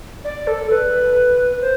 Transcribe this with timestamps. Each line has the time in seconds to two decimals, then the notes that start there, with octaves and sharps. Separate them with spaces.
0.25 D5
0.47 A4
0.70 B4
1.61 C5